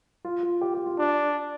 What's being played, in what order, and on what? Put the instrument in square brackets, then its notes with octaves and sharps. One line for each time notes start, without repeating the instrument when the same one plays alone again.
[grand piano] F4
F4
G4
G4
F4
[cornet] D4